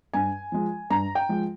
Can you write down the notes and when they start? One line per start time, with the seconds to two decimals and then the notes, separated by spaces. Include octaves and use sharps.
0.14 G2 G#5
0.52 F3 G#3
0.90 G2 A#5
1.15 G5
1.29 F3 G#3